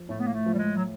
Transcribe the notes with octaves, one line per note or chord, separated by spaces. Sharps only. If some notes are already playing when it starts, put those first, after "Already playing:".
Already playing: F3
A2 A3
B3
A#3
A3
F3
G3
G#3
F#3